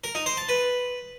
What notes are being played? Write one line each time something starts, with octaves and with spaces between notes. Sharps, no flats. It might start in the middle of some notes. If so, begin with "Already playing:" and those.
A#4
D#4
C5
A5
B4